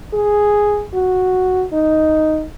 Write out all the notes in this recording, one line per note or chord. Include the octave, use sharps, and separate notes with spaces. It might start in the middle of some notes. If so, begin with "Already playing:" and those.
G#4
F#4
D#4